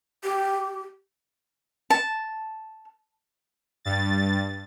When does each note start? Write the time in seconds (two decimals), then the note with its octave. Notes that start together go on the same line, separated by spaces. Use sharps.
0.24 G4
1.90 A5
3.85 G2 A6